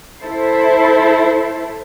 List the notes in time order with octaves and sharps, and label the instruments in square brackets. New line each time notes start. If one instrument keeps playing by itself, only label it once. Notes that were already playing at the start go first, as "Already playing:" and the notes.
[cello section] E4 A4 C5